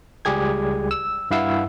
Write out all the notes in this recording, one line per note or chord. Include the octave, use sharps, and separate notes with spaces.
C#2 G3 G4 G#4 G#6
E6
G2 E4 F5 F#5 E6